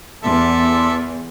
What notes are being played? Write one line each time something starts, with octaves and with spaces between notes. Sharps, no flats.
E2 A4 D5 E5 C6